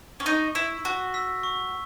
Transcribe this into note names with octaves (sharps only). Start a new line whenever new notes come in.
C#4
D#4 C#6
E4 E6 B6
F#4 C#6
E6 B6
C#6